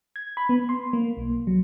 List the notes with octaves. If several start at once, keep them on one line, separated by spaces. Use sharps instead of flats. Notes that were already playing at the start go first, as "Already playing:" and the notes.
G#6
B5
B3
C6
A#3
B1
F#3